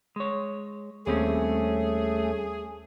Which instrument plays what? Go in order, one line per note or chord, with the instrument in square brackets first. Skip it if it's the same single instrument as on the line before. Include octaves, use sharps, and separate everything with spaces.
[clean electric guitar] G#3 C#5
[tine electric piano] D#2 C#5 [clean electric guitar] G3 C4 C#4 [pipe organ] A3 [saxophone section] G#4